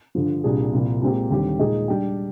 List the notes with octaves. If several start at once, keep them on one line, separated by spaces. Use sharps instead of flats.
G2 D3 F3
C2 A#2 G3 D4 G#4
C2 A#2 F3
A#2 G#3 C4 G4
D#2 D3 G3 C4 G4
A#2 G#3 D#4 G#4 D#5
G3 D4 G4